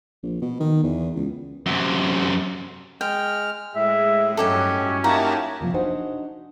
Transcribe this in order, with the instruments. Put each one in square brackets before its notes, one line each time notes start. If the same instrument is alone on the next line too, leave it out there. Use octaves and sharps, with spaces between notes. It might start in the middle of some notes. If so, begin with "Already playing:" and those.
[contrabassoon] A#1
B2
D#3
E2
C#2
[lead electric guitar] F#2 C3
[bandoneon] G#3 F6 [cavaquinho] G5
[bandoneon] A2 [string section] G#3 [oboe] E5
[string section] G2 F#3 [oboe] C#4 [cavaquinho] D#4 G4 A4
[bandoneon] A#3 F#4 G4 [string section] D#4 E4 A5 [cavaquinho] A#5
[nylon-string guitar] C3 F3 A#3
D4 D#4 F#4 C5 F#5 G#5